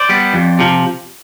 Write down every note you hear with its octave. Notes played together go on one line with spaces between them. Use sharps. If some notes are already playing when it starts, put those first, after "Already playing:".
Already playing: C5 D5
G3 B3
F2
C3 F3